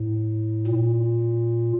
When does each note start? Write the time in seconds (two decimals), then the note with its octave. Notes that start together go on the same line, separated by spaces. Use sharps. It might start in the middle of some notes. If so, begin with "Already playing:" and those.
Already playing: A2
0.67 A#2